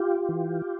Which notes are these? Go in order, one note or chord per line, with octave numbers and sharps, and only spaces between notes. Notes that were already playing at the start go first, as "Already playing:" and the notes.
Already playing: F4 G4
E3